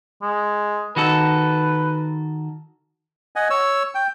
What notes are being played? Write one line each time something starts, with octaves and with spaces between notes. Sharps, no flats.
G#3
D#3 F#4 A4 B4
D#5 F#5 G#5
C#5 E6
G5